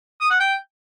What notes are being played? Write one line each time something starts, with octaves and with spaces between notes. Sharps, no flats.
D#6
F#5
G5